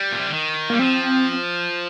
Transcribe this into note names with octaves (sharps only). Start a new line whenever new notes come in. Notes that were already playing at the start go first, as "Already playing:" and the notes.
Already playing: G3
A#2
C3
D3
D#3
G3 A#3
F3 C4